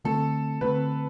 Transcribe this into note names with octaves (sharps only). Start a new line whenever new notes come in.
D3 A3 C4 A4
D3 A3 C4 B4